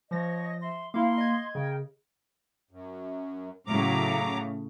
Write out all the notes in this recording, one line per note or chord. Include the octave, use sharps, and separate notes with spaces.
F3 C#5 D#5 A#6
E5 C6
A#3 E4 F5 C6
D#5 G#6
C#3 A#4 G5
F#2
A2 C#3 F#3 A#5 D6